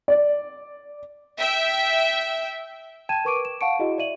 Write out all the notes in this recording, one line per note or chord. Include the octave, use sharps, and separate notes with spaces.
D5
E5 G5
G5 A5 G#6 D#7 E7
A#4 B4 C#6 D6 D7 D#7
E7
F5 F#5 A5 C#6 C#7 D7
E4 F#4 G#4 D#5
D5 E5 D#7 F#7